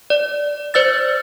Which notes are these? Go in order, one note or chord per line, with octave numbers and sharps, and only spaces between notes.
D5
C5 D5 E6 A6